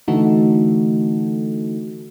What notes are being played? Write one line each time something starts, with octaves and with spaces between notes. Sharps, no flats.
D3 E3 A3 D#4 F#4 A4